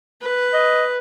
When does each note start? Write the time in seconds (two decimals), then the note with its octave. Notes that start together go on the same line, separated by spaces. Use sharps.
0.22 B4
0.54 D#5